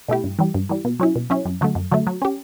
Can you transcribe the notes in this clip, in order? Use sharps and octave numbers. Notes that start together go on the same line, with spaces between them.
B2 A3 E4 G4
G2
E3 G3
G2
E3 G3
B2
F#3 C#4 E4
B2
F#3 C#4 E4
F#2
D3 F#3 A3
F#2
D3 F#3 A3
F#3
C#4 G4